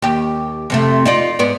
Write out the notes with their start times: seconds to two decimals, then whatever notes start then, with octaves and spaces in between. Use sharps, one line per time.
0.02 D#2 G4
0.70 F2 C3 A3
1.06 D#4 F4 D5
1.39 G#2 B3 D5